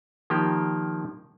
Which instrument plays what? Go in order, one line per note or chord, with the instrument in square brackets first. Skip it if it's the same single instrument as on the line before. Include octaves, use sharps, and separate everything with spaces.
[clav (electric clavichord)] D#3 F3 A#3 G4